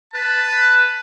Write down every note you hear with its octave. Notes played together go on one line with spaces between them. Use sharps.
B4 A5